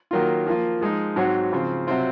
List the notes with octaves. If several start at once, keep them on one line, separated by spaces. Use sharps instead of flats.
D#3 F#3 A#3 F4
F3 A#3 F4
F3 G#3 D#4
G#2 F#3 C4 F#4 C#5
C#3 F3 C4
C3 F#3 C4 F4